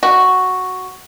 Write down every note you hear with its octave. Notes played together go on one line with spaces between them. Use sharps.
F#4